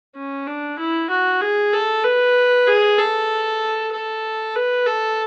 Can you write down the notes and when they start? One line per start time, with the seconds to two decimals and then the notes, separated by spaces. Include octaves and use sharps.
0.16 C#4
0.47 D4
0.79 E4
1.10 F#4
1.41 G#4
1.73 A4
2.04 B4
2.67 G#4
2.98 A4
3.92 A4
4.56 B4
4.86 A4